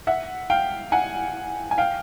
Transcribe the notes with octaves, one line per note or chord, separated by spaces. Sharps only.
E5 F#5
F5 G5
F#5 G#5
G#5
F5 G5